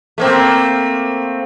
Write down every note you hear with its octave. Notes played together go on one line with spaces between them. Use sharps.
A3 A#3 C4